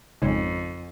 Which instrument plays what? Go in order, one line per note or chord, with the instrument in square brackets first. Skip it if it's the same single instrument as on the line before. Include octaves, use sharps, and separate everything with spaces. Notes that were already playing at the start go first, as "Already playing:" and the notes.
[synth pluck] G#1 C#3 [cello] F2